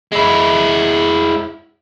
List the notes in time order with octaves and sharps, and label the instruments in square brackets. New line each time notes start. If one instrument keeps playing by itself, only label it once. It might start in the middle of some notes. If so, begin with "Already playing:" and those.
[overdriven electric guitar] G#3 E4